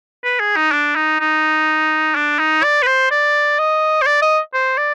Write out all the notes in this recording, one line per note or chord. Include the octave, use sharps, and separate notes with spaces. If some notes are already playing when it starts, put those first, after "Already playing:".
B4
G#4
D#4
D4
D#4
D#4
D4
D#4
D5
B4
C5
D5
D#5
C5
D5
D#5
C5
D5